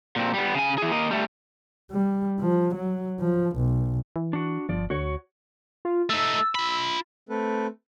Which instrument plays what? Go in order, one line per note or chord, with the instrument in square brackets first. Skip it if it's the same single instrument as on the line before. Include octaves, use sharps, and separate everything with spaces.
[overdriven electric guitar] A#2 C4
G3 B3
C#3 G#5
E3 G#4
A#3 D#5
G3 A3
[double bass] G3
F3
F#3
F3
B1
[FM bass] E3
[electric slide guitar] D4 F#4
[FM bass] G1 [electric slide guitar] F3 D5
[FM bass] D2 [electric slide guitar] F#4 C#5
[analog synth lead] F4
[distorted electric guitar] A3 D#4 [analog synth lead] E6
[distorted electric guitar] F4 B5
[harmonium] A3 C4 A4 B4